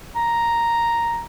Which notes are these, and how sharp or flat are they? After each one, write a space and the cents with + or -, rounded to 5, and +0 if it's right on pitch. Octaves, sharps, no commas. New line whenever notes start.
A#5 +0